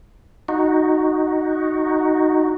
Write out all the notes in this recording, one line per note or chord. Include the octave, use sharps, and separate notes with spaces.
D#4 F#4